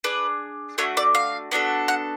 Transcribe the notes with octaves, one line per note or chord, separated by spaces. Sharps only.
D4 G#4 B4
A3 D4 F#4 C#5
D5
F5
B3 D4 F#4 A4
F#5